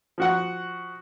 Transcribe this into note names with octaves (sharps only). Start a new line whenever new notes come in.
F3 F#4 F#5